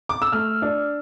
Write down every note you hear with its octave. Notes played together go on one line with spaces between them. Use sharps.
D6
E6
A3 F6
D4